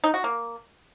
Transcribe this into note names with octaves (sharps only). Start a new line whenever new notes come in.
D#4
F#4
A#3